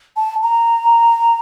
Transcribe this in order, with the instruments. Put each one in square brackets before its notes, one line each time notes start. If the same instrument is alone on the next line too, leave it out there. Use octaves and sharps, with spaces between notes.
[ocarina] A5
A#5